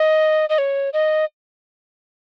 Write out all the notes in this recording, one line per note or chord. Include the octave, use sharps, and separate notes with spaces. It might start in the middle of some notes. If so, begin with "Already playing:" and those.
Already playing: D#5
D#5
C#5
D#5